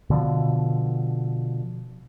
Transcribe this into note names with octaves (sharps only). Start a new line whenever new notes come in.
B2 D3 F3